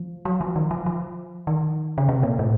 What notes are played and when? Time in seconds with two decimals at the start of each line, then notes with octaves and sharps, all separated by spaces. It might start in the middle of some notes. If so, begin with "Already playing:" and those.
Already playing: F3
0.25 F#3
0.41 F3
0.56 D#3
0.71 F3
0.86 F3
1.47 D#3
1.98 C#3
2.09 C3
2.23 A#2
2.39 A2